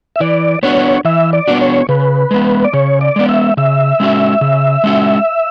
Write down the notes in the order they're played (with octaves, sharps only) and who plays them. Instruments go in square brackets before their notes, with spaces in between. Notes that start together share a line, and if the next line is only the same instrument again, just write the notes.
[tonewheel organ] E5
[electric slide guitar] E3 [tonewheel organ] D5
[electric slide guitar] B3 D4 F#4 [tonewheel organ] C#5
[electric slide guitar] E3 [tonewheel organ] E5
[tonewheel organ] D5
[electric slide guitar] B3 D4 F#4
[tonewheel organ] C#5
[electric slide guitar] C#3 [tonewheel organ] B4
[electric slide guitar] G#3 B3
[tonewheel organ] D5
[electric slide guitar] C#3 [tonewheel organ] C#5
[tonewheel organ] D5
[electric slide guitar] G#3 B3
[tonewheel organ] E5
[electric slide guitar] C#3 [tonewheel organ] E5
[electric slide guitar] G#3 C#4 F#4
C#3
G#3 C#4 F#4